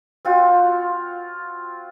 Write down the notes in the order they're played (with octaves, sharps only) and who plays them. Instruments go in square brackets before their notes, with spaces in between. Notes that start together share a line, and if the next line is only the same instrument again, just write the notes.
[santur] C4 F4 F#4